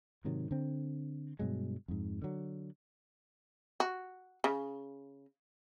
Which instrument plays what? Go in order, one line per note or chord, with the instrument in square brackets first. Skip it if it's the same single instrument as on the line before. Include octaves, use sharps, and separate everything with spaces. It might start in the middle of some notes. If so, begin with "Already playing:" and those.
[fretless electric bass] G#2 C3 D#3 F#3
D3 C4
G2 B2 F#3 G#3
F2 G#2
D3 F#3
[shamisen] F#4
C#3